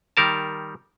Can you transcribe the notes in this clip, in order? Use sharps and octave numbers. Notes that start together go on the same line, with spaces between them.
D#3 G3 A#4 A5